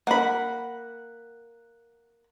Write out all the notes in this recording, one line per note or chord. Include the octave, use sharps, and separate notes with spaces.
A#3 F#5 B5